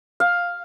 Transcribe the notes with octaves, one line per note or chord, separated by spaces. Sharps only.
F5